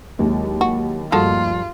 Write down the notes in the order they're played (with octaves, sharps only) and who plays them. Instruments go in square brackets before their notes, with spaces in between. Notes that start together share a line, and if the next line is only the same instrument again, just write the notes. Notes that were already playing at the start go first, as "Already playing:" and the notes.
[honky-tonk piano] D#2 [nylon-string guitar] F#3 G#3 E4
[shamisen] F#4
[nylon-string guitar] G2 F3 A3 [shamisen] G#3 F#4 A4 [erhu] F4